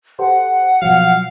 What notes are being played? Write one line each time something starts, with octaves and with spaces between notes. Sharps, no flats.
G4 A4 C5 F#5
B2 F3 F#3 F5